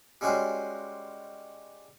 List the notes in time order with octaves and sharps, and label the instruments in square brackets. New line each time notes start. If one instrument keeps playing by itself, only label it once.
[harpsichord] G3 G#3 C#4 F#4 C5